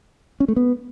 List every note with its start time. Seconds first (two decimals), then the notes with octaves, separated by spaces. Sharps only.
0.40 C#4
0.48 A3
0.56 B3